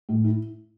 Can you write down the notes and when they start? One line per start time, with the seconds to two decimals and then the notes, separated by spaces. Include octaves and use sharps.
0.09 A2
0.24 E4